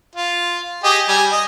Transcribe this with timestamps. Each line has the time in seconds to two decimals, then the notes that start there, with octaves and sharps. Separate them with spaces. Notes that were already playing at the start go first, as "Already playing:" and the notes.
0.15 F4
0.84 G4 G#4 D#5
1.08 G3 G#5
1.32 D#5